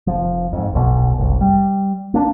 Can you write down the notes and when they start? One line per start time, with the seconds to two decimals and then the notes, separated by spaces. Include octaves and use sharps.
0.07 F1 F3
0.53 F2 G#2
0.73 D1 B1 B2
1.18 F#1 C2
1.41 G3
2.14 A#3 D4